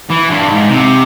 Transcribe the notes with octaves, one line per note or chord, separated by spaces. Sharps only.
E3
G2
G#2
C3